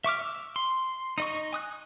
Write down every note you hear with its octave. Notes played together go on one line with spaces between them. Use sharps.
E5 C#6 D6 F6
E6
C6
D#4 D#5 C#6
G#5 D#6 F#6